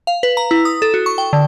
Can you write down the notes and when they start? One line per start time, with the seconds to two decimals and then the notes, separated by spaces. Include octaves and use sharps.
0.07 F5
0.23 B4
0.37 A#5
0.51 E4
0.65 D#6
0.82 A4
0.94 F#4
1.06 C#6
1.18 G5
1.33 D3